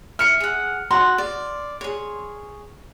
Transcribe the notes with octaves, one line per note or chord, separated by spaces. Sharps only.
E5 F6 C#7
G#4 F#5
F#4 C#5 F#5 C6
D5
G#4 C#5